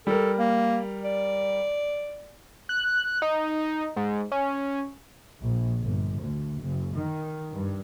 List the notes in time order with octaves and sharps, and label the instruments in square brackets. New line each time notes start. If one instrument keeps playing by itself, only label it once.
[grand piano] G3 A#4 [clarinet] A4
[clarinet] A#3
D5
[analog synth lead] F#6
D#4
G#2
C#4
[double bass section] A#1
G1
D2
F#1
D#3
G2